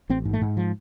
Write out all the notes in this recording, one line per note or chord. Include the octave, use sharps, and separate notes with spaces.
A1 C4
G#2
A3
G#2
F3